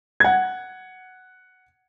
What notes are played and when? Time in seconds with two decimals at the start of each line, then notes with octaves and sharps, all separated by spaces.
0.20 F#5 G#6